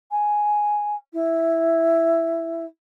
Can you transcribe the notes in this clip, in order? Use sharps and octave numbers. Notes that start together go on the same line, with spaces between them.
G#5
E4